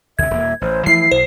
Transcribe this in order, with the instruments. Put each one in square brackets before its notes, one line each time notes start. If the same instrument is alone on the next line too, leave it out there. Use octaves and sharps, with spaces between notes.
[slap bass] D2 C3 [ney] E5 [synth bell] G#6
[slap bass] D#1 A#3
[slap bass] A1 [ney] C5
[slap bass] E3 F3 A3 [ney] E4 [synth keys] C7
[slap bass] B1 [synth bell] C5